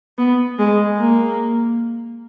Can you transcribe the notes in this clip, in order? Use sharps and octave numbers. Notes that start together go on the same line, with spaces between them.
B3
G#3
A#3